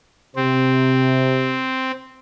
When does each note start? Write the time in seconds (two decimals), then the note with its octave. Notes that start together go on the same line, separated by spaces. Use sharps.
0.36 C3 C4